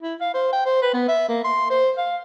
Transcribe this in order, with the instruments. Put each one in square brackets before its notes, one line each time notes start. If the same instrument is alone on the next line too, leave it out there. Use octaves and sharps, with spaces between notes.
[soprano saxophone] E4
F5
C5
G5
C5
B4
B3
E5
A#3
C6
C5
F5